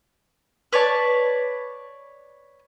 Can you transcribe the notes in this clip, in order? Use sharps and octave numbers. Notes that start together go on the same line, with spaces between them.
B4 C#5 D5 A5